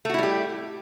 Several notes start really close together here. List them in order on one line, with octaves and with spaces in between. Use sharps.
A3 F#4 E4 G3 G4